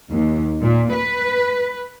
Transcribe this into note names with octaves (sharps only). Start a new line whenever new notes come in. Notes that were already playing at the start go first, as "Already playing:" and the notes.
D#2
A#2
B4